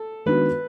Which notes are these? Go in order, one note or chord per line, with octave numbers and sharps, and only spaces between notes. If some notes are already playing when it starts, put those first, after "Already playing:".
Already playing: A4
D#3 G#3 B3 D4 F#4 B4